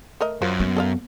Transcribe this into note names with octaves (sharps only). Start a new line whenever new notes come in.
A3 A#4 D#5
F#2 F4 A#4 C5
B3
A4 D#5 F5